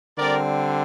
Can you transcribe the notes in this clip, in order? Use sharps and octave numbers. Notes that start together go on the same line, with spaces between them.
D3 G3 C4 A#4 D5